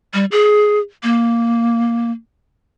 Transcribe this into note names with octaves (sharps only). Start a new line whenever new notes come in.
G3
G#4
A#3